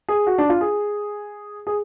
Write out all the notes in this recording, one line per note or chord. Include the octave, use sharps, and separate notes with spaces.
G#4
F#4
D4
F4
G#4
G#4